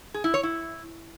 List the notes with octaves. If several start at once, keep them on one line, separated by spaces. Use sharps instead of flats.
G#4
E4
C#5
E4